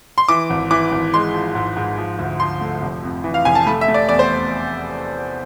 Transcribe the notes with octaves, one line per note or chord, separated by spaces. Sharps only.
C6
E3 D6
G#1
E3 D6
G#1
G#3 C6
F3
G#2
G#2
F3
D2
F3 C6
A3
F1
F2
E3
F5
F1 G#5
A5
A3 B5
E5
A3
D5
E2 D5
C5